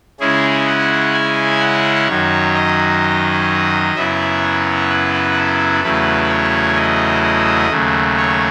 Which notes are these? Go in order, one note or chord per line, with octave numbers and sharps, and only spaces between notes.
C#3 G#3 C#4 E4 G#4
F#5
G#5
F#5
F#2 D#3 F#3 C#5
D#5
F#2 C#3 F#3 B3 E4 E5
C#5
B4
A4
E2 C#3 F#3 A3 E4 B4
C#5
D#5
D#5
D#2 C#3 F#3 A3
C#5